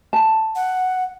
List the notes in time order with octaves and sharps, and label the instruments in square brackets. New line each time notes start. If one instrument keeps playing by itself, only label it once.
[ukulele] A5
[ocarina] F#5